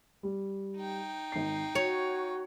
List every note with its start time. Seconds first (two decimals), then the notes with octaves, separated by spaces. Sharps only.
0.23 G3
0.77 D#4 G5
1.32 G#1 C7
1.75 F#4 C#5 F7